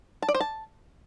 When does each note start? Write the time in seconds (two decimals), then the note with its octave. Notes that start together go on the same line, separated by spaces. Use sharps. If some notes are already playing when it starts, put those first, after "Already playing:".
0.22 A5
0.28 D5
0.34 C5
0.40 A5